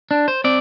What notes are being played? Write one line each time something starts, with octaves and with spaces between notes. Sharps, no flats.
D4
C5
C4 D5